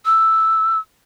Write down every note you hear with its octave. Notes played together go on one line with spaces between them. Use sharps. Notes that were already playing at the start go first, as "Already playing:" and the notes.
E6